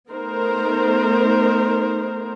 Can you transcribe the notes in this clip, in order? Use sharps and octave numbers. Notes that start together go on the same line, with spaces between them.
A3 B3 D#4 A#4 C5